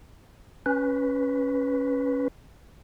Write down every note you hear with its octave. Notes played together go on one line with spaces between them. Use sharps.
C#4 B4